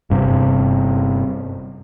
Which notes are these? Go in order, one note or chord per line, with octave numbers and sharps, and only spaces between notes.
G1 G2 C3